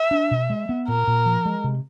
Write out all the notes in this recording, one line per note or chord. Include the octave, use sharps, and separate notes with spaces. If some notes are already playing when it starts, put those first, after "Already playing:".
Already playing: E5
D4
B2
G#3
B3
A#2 A#4
A#2
F3
G#3
C3